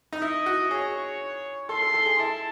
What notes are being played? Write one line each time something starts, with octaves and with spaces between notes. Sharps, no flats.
D#4
E4 D#5
F#4
G#4 C#5
A4 C6
A4
A4
G#4
E4 A5